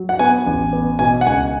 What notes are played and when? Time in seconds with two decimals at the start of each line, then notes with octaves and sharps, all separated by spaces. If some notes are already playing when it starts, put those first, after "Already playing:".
Already playing: F#3
0.09 F#5
0.19 B3 G#5
0.47 A1
0.73 B3
0.99 B2 G#5
1.21 F#5
1.26 C#2 G#5